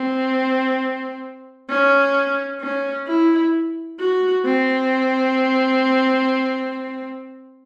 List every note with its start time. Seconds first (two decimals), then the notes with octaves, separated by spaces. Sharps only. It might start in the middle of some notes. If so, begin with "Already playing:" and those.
Already playing: C4
1.69 C#4
2.60 C#4
3.07 E4
3.99 F#4
4.45 C4